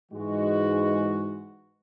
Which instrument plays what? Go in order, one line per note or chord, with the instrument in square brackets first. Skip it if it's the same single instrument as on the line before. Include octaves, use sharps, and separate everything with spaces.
[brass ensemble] G#2 E3 G#3 F#4